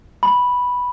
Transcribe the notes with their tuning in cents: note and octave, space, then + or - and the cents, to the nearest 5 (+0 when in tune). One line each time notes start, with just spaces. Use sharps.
B5 -5